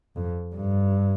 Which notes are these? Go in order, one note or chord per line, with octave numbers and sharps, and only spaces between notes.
F2
G2